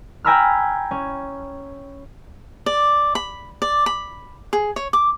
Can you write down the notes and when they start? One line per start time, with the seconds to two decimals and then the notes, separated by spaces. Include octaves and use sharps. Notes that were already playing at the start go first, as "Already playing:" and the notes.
0.25 G5 G#5 A#5 B5 E6 F6
0.91 C#4
2.66 D5
3.15 B5
3.62 D5
3.86 B5
4.53 G#4
4.76 C#5
4.93 D6